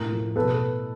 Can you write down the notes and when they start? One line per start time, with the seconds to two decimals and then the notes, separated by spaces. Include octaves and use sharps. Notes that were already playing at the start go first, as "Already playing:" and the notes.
Already playing: A2 A#4
0.11 F3
0.36 B2 A4 B4